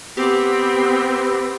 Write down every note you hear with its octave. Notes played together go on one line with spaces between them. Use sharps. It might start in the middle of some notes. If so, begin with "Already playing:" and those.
B3 C4 G4